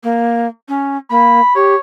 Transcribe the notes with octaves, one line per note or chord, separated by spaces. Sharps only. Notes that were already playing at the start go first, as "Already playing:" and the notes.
A#3
C#4
A#3 B5
G4 C#5